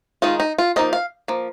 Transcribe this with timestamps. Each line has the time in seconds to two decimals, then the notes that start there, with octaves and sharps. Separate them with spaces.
0.22 D#3 G#3 D#4 F4
0.40 D#4
0.58 F4
0.76 F3 A#3 D#4 D#5
0.93 F5
1.28 F3 A#3